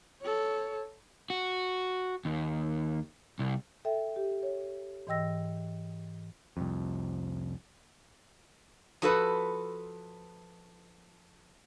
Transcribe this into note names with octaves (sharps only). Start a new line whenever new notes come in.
A4 C#5
F#4
D#2
C2
A4 E5 G5
G4
C#5
G#2 E3 D#5 G5 E6 A#6
C2 F2
F3 F#4 A4 B4